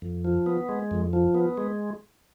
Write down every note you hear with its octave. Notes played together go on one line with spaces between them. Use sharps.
F2
F3
B3
G#3
F2
F3
B3
G#3